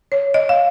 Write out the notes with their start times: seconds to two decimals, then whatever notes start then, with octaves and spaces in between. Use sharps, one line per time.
0.12 C#5
0.34 D#5
0.49 F5